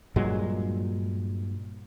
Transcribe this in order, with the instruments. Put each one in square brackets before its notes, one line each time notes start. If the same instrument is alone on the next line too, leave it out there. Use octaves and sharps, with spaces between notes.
[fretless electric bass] G2 A#2 F#3 G#3